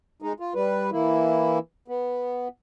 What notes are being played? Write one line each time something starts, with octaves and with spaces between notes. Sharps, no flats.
G#3 D#4
F4
G3 B4
E3 A#3 E4
B3